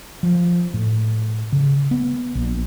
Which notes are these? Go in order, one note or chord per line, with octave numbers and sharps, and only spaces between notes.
F3
A2
C#3
B3
A#1